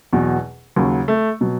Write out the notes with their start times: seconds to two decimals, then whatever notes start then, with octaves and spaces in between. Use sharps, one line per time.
0.13 E2 B2 F#3
0.76 D#2 C#3 F#3
1.08 A3
1.41 B2 F#3